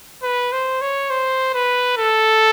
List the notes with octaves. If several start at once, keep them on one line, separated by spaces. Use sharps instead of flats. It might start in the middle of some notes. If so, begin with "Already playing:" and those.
B4
C5
C#5
C5
B4
A4